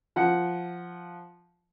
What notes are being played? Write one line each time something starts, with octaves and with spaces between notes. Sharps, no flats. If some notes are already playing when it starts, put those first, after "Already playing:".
F3 F#5